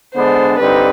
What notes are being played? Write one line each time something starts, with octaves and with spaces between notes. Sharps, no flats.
D3 G#3 B3 D4 C5
D3 G3 C4 D#4 B4